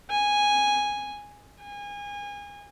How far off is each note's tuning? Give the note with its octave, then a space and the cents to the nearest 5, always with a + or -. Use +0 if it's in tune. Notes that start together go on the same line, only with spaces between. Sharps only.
G#5 -5
G#5 -30